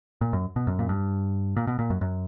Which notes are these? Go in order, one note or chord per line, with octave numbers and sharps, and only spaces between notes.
A#2
F#2
B2
F#2
A#2
G2
A#2
B2
A#2
F#2
F#2